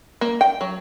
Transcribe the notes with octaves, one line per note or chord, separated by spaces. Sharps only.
A#3
G5
F#3